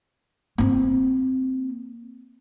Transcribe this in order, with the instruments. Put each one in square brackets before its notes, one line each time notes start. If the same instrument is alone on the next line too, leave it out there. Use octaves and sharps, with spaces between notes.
[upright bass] A#3 C4